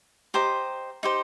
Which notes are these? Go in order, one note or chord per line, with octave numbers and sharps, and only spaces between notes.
G4 C5 D#5 A#5
D#4 G4 C5